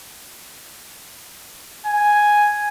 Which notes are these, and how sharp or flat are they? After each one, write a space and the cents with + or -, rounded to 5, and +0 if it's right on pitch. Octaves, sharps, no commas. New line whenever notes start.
G#5 +0